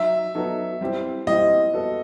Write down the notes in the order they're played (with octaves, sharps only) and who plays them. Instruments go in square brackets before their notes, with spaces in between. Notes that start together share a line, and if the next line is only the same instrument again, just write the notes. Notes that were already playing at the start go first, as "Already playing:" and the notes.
Already playing: [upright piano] F#3 D#4 [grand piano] E5
[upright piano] F#3 B3 D#4 A4
G3 C4 E4 G4
[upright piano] G3 C4 E4 G4 [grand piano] D#5
[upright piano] B3 F#4 A4 D#5